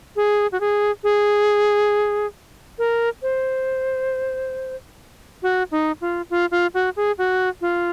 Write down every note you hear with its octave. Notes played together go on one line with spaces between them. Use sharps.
G#4
F#4
G#4
G#4
A#4
C5
F#4
D#4
F4
F4
F4
F#4
G#4
F#4
F4